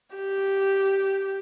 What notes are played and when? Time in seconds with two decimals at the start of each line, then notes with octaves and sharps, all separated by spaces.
0.16 G4